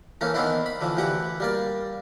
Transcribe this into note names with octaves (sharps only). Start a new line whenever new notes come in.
E3 A3 A#3 C#4
D#3 E3 B3 C4 D4 E4
B5
D3 E3 F3
D2 E3 G4 F#5
G3 A#3 D5